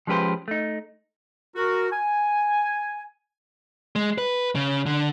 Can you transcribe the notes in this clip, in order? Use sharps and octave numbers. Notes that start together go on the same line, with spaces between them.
F3 G#3 C#4 G4 B4 C5
A3 D#4
F#4 A#4
G#5
G#3
B4
C#3
D3